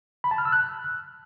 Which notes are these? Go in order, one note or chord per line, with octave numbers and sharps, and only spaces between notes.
B5
A5
F6
E6
F#6